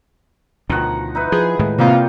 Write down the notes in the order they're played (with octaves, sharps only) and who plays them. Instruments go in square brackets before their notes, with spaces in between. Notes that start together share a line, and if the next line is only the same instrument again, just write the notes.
[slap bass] D2 B2 [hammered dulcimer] D#3 F3 F#5
[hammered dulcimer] D#4 E4 B4
[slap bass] F3 [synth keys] G#4
[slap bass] A2 D#3 G#3
[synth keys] C3 A#3 F4 [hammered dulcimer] G3 D#4